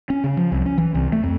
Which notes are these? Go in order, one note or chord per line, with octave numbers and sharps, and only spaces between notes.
C#4
C#3
F3
C2
C#4
E3
C2
A3
F2